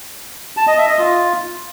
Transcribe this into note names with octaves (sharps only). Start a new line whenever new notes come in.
A5
D#5
E5
D#5
F4